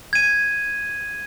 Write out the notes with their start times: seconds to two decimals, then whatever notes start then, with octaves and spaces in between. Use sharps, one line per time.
0.13 G#6 D#7